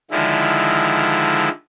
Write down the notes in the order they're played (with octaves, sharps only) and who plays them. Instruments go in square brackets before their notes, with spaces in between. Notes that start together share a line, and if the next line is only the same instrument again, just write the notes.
[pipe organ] D3 D#3 F3 G#3 E4